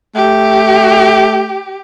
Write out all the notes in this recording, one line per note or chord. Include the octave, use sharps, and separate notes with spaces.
A3 G4